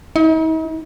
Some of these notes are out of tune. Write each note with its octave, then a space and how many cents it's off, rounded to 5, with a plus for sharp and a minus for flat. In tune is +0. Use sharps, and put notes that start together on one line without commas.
D#4 +45